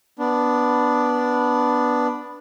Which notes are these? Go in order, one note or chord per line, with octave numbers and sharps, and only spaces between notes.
B3 D4